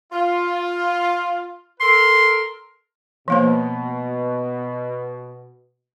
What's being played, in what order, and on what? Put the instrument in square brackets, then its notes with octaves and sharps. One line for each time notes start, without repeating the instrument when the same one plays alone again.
[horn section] F4
[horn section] A4 A#4 [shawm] C6
[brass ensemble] B2 [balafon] F3 A#3 C5